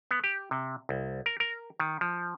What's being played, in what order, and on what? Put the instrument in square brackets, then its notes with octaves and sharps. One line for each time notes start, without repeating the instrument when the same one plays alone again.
[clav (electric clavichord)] B3
G4
C3
C2
A#4
A#4
D#3
F3